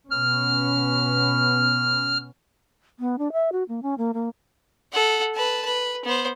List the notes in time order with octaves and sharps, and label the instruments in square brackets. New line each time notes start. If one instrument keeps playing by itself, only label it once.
[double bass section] B2 B3 C#4 [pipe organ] F6
[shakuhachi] B3
D4
E5
F#4
A#3
C#4
A#3
A#3
[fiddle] A4 F#5
B4 A5
B4
B3 C5